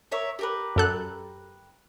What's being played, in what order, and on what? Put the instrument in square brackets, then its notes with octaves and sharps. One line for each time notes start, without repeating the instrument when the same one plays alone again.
[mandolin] A#4 C#5 E5
G4 A#4 B4
[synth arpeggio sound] F#2 A4 F#6